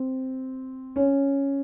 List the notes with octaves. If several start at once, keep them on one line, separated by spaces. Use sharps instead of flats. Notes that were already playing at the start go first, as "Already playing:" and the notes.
Already playing: C4
C#4